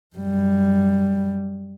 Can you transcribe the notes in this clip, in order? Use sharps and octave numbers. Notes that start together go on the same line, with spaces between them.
F#2 G3